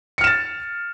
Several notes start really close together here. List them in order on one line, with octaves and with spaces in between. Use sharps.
C#7 F6 E7 A6